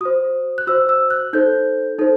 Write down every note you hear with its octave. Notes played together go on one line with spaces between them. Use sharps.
F#4 C5 D#6
F#6
F#4 C5 E6
E6
F#6
D#4 A4 C5 G6
D#4 A4 C5